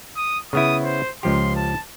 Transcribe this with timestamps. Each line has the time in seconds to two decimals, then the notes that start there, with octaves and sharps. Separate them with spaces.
0.16 D#6
0.53 C#3 B3 E4 D#6
0.84 C5
1.23 C#2 F3 G4 C6
1.56 A5